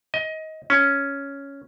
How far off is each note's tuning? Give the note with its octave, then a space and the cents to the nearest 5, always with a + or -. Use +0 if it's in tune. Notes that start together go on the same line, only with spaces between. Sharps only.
D#5 +20
C#4 +5